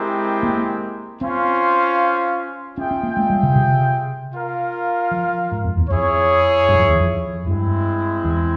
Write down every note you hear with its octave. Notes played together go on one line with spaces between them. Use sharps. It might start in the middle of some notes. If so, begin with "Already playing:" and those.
Already playing: G#3 C4 E4 G4 A#4
A#3
C4 C#4 F4 C5 F5
C#4 F4 G#4 E5 G5
C#4
A#3
G#3
G3
C#3
C3
F4 A#4 F5
F3
G#2
F2
E2
F2 E4 G#4 C#5
G2
F2
E2
F2
G2 G#3 C4 E4
E2